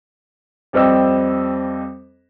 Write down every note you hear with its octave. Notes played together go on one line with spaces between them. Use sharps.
F2 G3 C4 D#5 E6